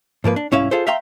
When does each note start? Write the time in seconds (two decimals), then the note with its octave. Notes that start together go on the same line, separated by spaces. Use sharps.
0.24 G#2 F3 A#3 B4
0.36 D4
0.52 C2 G#2 C#4 E4 E5 F5
0.71 F4 G#4 A4 C5
0.87 E5 F5 G5 A#5 C6